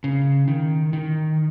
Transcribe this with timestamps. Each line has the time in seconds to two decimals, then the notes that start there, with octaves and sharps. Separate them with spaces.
0.04 C#3
0.48 D#3
0.93 D#3